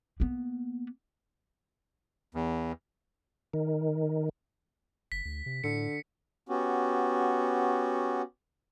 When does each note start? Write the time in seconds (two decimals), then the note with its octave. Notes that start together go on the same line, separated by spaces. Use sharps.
0.20 A#3 B3
2.35 E2
3.53 D#3
5.12 F#1 B6
5.25 D2
5.46 C3
5.64 A2 D3 C#7
6.49 B3 C#4 F#4 G4